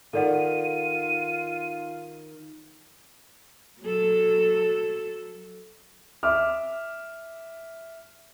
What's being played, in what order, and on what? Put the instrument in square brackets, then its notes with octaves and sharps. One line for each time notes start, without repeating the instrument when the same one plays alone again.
[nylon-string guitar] D#3 [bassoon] F4 [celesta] A4 D5 F#5 [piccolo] D#7
[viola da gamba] F#3 A4
[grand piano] E5 D6 F6